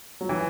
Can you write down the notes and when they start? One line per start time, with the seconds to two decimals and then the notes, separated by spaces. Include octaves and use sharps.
0.21 F#3
0.29 E3